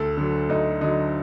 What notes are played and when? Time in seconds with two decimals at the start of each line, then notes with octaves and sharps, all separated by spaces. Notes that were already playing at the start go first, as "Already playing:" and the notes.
Already playing: D2 A4
0.17 D3 F#3
0.49 D2 D#4
0.81 D3 F#3 D#4